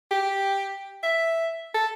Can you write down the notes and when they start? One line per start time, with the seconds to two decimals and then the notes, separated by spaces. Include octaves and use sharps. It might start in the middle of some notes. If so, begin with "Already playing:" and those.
0.11 G4
1.03 E5
1.74 A4